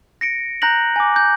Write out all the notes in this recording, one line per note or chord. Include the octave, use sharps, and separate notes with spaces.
A#6 C#7 D7
A#5 F#6 G6 A#6 F#7
G#5 D6
G6